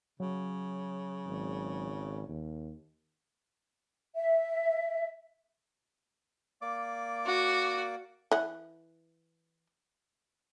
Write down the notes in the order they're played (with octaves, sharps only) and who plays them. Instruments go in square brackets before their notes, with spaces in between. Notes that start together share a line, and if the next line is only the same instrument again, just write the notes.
[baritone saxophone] C#3 [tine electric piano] F#3
[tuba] G#1
D#2
[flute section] E5
[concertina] A#3 D5 D6
[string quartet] F#4
[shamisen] E3 F#5